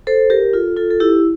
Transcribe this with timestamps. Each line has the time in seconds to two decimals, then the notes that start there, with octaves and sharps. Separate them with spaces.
0.07 A4 C5
0.30 G4 A#4
0.53 F4 A4
0.77 F4 A4
0.91 A4
1.00 E4 G4